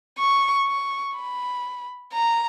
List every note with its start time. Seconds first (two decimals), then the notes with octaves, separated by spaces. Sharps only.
0.19 C#6
0.68 C#6
1.16 B5
2.14 A#5